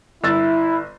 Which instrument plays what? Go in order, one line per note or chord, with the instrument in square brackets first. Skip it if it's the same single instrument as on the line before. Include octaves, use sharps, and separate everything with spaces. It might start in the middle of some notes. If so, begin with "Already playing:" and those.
[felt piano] G1 E6 A6 [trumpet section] E4